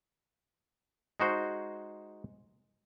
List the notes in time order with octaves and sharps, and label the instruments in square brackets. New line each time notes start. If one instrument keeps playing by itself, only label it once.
[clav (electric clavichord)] G#3 D#4 F#4 C5